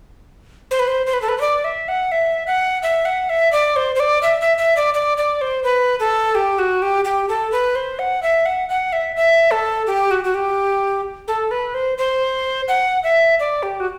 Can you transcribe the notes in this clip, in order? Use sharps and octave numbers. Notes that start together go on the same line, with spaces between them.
C5
B4
C5
C5
B4
A4
B4
C5
D5
E5
F#5
E5
F#5
E5
F#5
E5
D5
C5
C5
D5
E5
E5
E5
D5
D5
D5
C5
B4
A4
G4
F#4
G4
G4
A4
B4
C5
F#5
E5
F#5
F#5
E5
E5
A4
G4
F#4
F#4
G4
A4
B4
C5
C5
F#5
E5
D5
G4
F#4